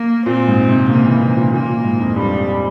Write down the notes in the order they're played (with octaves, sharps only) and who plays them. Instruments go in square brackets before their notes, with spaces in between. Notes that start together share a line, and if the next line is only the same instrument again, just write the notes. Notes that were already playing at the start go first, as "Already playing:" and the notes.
Already playing: [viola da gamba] A#3
[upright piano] A#2 [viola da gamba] C4
[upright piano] G#2
C3
[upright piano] C#3 [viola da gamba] A#3
[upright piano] E3
C#3
A#2
[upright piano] A#2 [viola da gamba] A#3
[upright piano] A#2
G#2
F2
[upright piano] G2 [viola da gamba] G3